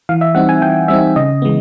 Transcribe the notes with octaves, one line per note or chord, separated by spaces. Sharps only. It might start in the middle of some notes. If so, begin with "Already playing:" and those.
E3 F5
E5
G3 C4 D#4 F#5
G#5
E3 G5
G3 C4 D#4 E5
C#3 D#5
E3 G#3 B3